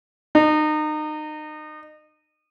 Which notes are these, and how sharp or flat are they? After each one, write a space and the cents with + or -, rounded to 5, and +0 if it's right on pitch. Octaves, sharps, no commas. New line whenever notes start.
D#4 -30